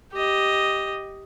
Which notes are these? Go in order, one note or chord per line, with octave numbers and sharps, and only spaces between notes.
G4 D#5